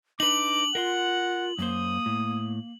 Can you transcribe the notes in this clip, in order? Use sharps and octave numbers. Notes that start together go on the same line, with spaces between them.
D4 D#4 B4 D6 F#7
F4 A#4 F5 F#5 C6
F#2 A#3 C5 D#6
A2